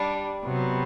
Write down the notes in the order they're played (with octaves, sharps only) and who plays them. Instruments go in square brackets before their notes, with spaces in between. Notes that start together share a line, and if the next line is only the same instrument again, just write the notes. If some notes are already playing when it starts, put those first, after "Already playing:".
Already playing: [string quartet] G3 D4
C3 F#3 B3